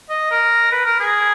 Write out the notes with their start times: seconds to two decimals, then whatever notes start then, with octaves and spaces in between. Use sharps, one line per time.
0.10 D#5
0.31 A#4
0.72 B4
0.85 A#4
1.00 G#4